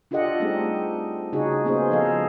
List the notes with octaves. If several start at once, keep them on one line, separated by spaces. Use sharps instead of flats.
D4 F4 G4 A4 D#5 F#5
G3 A3 C4 D#4 G4 G#4
C#3 C#4 D#4 F#4 G#4
A#3 B3 C#4 D#4 G#4 C5
F3 A4 D#5 F5